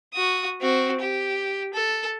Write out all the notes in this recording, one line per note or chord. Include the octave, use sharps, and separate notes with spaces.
F#4 D#6
C4 F#4
G4
A4